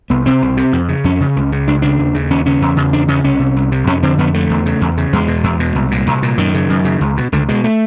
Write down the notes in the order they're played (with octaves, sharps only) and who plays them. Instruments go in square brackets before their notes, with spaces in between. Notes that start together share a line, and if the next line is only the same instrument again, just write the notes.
[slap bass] C2 B3
C3 C4
C2
C3
F2
C#3
F2 C#4
C#3
C#2
C#3
C#2 D4
C#3 D4
D#2
C#3
D#2 C#4
C#3 C#4
E2
C#3
E2 D4
C#3 C#4
C2 C#4
C3
C2
C3
F2 C#4
D3 C4
F2 B3
D3 A3
E2
C#3
E2
C#3
E2 G#3
B2
E2
B2
C2
A#2
C2
A#2
F#2 D#3
C#3
F#2
C#3
C#2
B2
C#2 D3
B2 G#3
A3